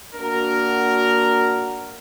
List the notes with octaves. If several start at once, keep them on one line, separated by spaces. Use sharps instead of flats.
A#3 D4 F#4 A#4